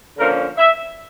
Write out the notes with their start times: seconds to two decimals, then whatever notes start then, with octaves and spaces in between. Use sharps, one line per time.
0.18 D3 F3 A#3 C#4 A#4
0.58 E5